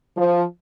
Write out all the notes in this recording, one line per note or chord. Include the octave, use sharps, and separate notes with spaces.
F3